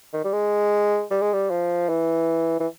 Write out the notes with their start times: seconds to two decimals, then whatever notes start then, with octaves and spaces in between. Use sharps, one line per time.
0.13 D#3
0.25 G3
0.33 G#3
1.11 G3
1.22 G#3
1.34 G3
1.50 F3
1.89 E3
2.60 E3